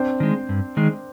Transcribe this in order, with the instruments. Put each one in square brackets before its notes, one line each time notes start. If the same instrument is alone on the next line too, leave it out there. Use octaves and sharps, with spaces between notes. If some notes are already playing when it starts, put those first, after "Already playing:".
Already playing: [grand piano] C4 D4
[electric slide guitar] D#3 G#3
G2
D#3 G#3